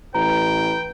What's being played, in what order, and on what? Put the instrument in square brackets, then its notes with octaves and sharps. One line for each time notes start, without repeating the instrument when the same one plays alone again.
[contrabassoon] A1 [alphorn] B4 [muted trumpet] G5 [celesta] A#5